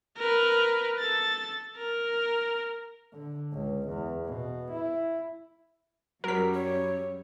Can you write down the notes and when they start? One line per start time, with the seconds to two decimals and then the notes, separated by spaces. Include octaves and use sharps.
0.17 A#4 B4
0.99 A4 A6
1.77 A#4
3.13 D3
3.53 C#2
3.88 E2
4.25 B2
4.71 E4
6.24 F#2 F#3 G3 A#4 B6
6.54 C#5